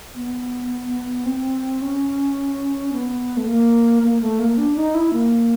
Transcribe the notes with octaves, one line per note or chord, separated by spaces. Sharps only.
B3
C4
C#4
B3
A3
A#3
A#3
A3
A#3
D4
D#4
E4
A#3